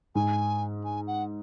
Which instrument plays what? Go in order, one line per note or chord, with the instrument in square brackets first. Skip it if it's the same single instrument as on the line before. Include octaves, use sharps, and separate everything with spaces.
[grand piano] G#2 [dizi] G#5
[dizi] G#5
F#5